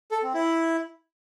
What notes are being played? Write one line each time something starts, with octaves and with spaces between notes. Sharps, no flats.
A4
C4
E4